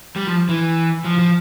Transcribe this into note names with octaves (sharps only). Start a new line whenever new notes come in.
G3
F3
E3
F3
F3